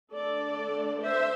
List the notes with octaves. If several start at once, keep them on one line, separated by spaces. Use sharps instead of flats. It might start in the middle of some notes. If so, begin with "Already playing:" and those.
D3 A3 D4 A4 D5
C5 E5